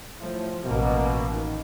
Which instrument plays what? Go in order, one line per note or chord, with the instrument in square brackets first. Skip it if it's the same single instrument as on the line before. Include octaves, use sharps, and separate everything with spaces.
[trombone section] A2 [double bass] F3
[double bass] A1 A#3 [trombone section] B2
[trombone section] D#3